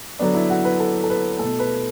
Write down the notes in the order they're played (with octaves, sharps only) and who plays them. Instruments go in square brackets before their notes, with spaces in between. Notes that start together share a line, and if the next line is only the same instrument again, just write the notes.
[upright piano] D3 F#3 B3 D4
E4
F#4
B4
A4
A4
B4
A3 A4
B2
B4